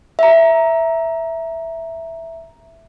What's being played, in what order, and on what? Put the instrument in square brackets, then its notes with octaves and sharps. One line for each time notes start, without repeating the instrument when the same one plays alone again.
[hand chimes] E5 A#5